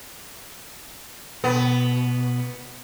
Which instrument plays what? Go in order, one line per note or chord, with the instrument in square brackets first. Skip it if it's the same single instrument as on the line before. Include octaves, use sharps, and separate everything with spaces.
[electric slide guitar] B2 [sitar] B3